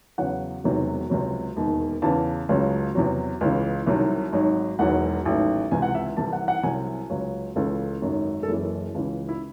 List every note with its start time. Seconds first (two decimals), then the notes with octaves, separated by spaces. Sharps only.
0.18 E2 C#3 F#3 F#5
0.64 E1 E2 C3 D#3 F#3
1.10 C#2 C3 F#3
1.57 E1 D#2 D#3
2.02 E2 C#3 E3 A5
2.49 C#2 C#3 F#3
2.95 E2 C3 F#3
3.41 C#2 C#3 E3
3.87 C2 C3 D#3 F#3
4.32 G#1 G#2 F#3
4.79 E1 E2 D#3 F#3 F#5
5.25 A1 G#2 D#3 F#3
5.71 C#2 C3 E3 G#5
5.82 F#5
5.95 E5
6.17 C2 C3 E3 A5
6.33 F#5
6.48 F#5
6.63 C2 C3 F#3 G#5
7.10 C#2 C#3 F#3
7.56 C#2 C#3 E3 A4
8.02 G#1 F#2 D#3 F#3
8.43 A4
8.47 F#1 F#2 E3 G#4
8.94 C#2 C#3 E3
9.29 E4